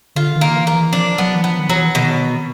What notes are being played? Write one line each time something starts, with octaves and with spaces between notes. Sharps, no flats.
D3 F4
D#3
A#3
E3
A#3
E3
F3 D4
F#3 B3
E3
F3 B3
D#3
E3 F#3
B2 D#3